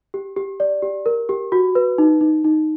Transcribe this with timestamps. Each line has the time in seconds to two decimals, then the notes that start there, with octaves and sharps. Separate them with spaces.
0.14 G4
0.37 G4
0.60 D5
0.82 G4
1.06 A#4
1.29 G4
1.52 F#4
1.75 B4
1.98 D#4
2.21 D#4
2.44 D#4